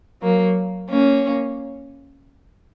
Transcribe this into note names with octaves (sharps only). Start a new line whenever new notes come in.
F#3 A#3
A#3 C#4